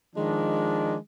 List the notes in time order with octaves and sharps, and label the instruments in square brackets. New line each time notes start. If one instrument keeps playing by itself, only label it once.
[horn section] D#3 F3 G#3 D4